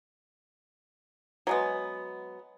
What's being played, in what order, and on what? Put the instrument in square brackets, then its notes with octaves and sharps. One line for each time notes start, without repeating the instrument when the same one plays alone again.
[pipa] F#3 G#3 B3